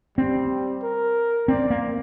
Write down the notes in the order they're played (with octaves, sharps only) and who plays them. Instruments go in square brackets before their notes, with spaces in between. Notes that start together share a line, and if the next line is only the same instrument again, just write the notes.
[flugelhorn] G3 [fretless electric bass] C4
[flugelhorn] A#4
[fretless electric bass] C4 [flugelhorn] D5
[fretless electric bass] A#3